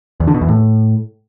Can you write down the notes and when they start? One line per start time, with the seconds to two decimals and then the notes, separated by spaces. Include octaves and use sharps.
0.20 E2
0.27 D3
0.34 B2
0.41 E2
0.48 A2